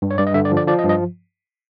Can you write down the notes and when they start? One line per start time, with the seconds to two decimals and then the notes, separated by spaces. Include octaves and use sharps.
0.02 G2
0.11 C#5
0.18 G2 D5
0.27 D#5
0.34 D3 E5
0.45 D5
0.52 F3
0.57 D5
0.67 F3 D5
0.79 D#5
0.83 G2
0.89 D#5